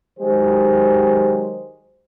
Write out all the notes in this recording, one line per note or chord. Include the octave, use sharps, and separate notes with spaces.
D#3 F#3 G#3 G4 C5